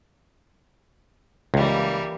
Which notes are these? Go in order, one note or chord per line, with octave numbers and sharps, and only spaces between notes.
C#2 E3 G3 A#3